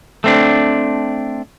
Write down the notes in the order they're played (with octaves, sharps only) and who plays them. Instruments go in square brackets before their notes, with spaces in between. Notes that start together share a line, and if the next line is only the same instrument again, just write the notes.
[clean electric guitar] A3 C4 D4